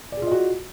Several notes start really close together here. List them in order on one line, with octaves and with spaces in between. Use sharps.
D5 G#4 F4 D#5 F#4